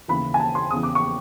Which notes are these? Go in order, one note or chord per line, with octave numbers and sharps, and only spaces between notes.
D#2 C#3 E3 B5
G#5
A5
C6
E2 C#3 E3 D#6
D6
C#6